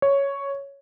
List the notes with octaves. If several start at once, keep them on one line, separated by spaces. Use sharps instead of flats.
C#5